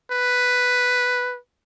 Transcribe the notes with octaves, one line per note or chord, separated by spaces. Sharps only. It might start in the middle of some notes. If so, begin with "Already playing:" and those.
B4